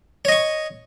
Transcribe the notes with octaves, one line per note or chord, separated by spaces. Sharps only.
C#5 D#5 C#6